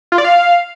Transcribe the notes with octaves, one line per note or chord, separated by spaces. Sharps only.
F4
D5
F5